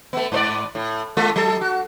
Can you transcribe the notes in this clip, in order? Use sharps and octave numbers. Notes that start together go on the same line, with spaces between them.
A3 B3
G#2 C5 D5
A2
G#3 F4 A4
F#3 A4
F#4